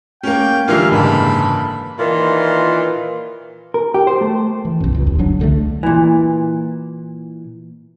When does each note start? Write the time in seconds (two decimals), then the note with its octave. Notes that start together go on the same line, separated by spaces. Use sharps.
0.23 A#3 C#4 G5
0.68 A#2 D3 E3 G3 A#3 F4 F5
0.91 F#1 G#2 A5 B5
1.99 A#2 D#3 E3 F4
3.74 A#4
3.94 G4
4.07 C5
4.21 A3
4.65 E3
4.80 B1 F#2
4.95 D1 C#2
5.07 D#2
5.19 G1 D2 F#3 D4
5.40 C#2 D3 E3 A3
5.83 A#2 E3